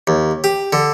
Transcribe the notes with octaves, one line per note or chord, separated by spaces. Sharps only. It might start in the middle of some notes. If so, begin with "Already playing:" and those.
D#2
G4
D3